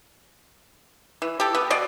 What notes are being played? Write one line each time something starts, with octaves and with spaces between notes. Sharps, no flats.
E3
G4 A4
B3
B2 D5 D#5